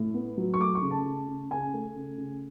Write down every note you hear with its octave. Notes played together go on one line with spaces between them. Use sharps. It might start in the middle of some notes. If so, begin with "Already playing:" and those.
Already playing: A2
B3
F#3
C#6
A3 D6
C#6
C#3
A5
C#3
C#3
C#3 G#5
A3
C#3
C#3